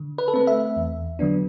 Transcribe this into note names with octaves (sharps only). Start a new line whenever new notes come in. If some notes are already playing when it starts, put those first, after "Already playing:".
Already playing: D3
B4
A4
A3 C4 B4
E5
E2
D3 F#3 B3 D4